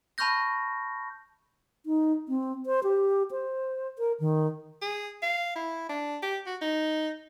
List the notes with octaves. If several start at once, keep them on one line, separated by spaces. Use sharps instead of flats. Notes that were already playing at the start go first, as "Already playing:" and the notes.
A5 B5 C#6 F6 G6 A#6
D#4
C4
C5
G4
C5
A#4
D#3
G#4
F5
E4
D4
G4
F#4
D#4